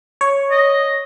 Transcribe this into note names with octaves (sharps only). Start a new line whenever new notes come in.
C#5
D#5